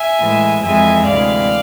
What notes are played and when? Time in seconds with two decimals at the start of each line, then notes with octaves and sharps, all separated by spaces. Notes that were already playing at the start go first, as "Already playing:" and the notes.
Already playing: E5 G#5
0.19 A2 E3 G#3
0.62 F2 E3 G#3 E5 G#5
1.05 D2 C3 E3 G#3 D5 F5